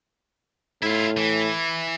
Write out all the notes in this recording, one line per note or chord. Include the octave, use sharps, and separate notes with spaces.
A2 E4 F4
E3